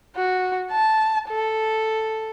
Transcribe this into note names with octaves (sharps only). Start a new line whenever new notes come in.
F#4
A5
A4